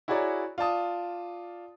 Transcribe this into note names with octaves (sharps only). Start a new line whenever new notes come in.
E4 F#4 G#4 C#5 D5 A#5
F4 D5 A5 D#6